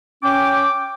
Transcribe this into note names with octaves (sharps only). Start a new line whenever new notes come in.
C#4 G5 D6